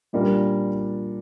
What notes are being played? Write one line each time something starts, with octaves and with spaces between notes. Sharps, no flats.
A#2 G3 D4 F4 A#4